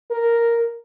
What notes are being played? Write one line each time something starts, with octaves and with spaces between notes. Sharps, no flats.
A#4